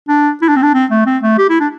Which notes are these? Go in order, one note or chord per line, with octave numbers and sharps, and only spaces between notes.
D4
E4
D4
C4
D4
C4
A3
C4
A3
G4
E4
D4